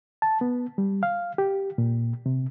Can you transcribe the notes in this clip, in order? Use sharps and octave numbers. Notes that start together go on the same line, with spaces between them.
A5
B3
G3
F5
G4
A#2
C3